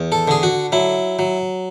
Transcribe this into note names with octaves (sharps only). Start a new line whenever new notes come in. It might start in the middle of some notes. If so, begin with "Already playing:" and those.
Already playing: E2
A4
D3 G#4
F#4
F#3 E4
F#3